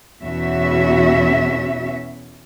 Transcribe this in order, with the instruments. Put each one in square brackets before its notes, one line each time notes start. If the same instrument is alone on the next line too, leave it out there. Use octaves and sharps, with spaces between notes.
[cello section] E2 B2 C#4 F#4 E5